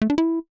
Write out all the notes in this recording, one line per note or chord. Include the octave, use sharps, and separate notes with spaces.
A3
D4
E4